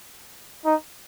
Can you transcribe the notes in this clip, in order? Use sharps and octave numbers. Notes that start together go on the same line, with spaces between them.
D#4